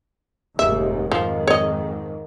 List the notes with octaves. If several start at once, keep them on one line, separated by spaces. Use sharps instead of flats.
F1 D#2 G#2 E5
F2 G#2 D#3 F3
C#5 D#5